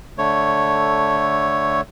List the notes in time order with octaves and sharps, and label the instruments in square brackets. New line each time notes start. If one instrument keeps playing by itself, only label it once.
[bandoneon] D3 A3 C#5